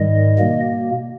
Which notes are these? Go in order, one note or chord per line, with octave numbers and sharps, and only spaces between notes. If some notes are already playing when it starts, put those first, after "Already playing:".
Already playing: G#2 D#3 G3 D#5
B2 A#3